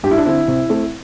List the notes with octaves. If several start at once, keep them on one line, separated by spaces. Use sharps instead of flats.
G2 G4
E4
D4
D3 C4 E4
C3
A3 C4